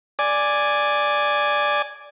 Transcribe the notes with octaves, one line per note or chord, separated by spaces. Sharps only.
D5 G#5